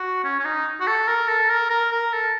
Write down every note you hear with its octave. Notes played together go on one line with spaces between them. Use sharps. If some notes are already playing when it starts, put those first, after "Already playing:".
Already playing: F#4
C#4
C#4
D#4
F#4
A4
A#4
A4
A#4
A#4
A#4
A4